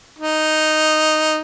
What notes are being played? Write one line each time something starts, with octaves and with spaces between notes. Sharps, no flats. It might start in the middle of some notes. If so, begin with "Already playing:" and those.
D#4